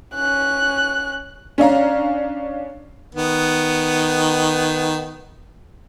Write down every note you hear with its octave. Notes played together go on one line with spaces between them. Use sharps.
C#4 F#6
C#4 D4 F5 A#5
D#3 B3